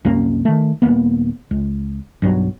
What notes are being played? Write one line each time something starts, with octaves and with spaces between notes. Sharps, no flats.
C2 F#2 A#3 C#4
D#3 A3
D#1 G#1 A#3 B3
C#2
B1 G2 F#3